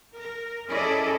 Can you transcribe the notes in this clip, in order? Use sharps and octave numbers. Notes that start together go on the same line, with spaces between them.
A#4
C#4 E4 G#4 A4 D5 D#5